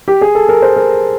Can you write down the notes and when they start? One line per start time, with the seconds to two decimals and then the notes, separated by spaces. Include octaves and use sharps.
0.08 G4
0.21 G#4
0.35 A4
0.49 A#4
0.62 C5
0.76 A#4